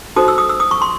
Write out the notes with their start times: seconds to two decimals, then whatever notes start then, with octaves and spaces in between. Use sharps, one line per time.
0.16 D#4 F#4 A4 C5 D#6
0.28 E6
0.38 D#6
0.49 E6
0.60 D#6
0.71 C#6
0.82 C6